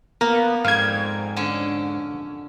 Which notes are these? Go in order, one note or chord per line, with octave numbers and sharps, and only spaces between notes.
A#3 B3 A#4
F2 G#2 G3 F5 G#6
D3 C#4